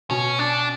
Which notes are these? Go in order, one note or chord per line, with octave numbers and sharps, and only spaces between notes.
B2 C#4
D4